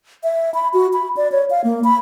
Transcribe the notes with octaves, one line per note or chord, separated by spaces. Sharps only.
E5
B5
F#4
B5
D5
C#5
F5
A#3
B5